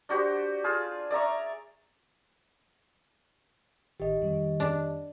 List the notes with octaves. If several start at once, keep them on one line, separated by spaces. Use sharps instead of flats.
D4 F#4 G4 C5
F4 G#4 A5
D5 E5 A#5 C#6
A1 D#3 G4 D#5
F2 D#3 G3
D4